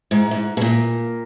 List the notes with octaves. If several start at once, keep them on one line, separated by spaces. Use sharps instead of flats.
G#2
G#2
B2
A#2